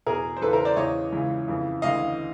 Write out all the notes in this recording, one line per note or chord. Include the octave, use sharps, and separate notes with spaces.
E2 B2 G#4 A#4
C5
E2 C#3 E3 A4 B4
A#4 C5
C5 D5
E2 C#3 E3 C#5 D#5
C#2 C#3 E3
F2 C#3 E3
D2 C#3 E3 D#5 F5